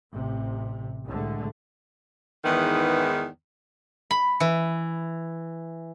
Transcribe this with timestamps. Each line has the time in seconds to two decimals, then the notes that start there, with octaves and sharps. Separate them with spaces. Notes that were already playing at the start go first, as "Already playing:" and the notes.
0.12 A1 C3
1.07 C2 A2 D3 G#3 A3
2.45 E2 G#2 D#3 E3 B3
4.11 B5
4.40 E3